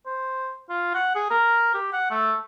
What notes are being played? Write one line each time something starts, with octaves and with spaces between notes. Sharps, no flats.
C5
F4
F#5
G#4
A#4
G4
F#5
A3